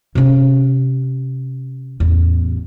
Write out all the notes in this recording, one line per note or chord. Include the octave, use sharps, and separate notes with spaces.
C3 C#4
A1 E2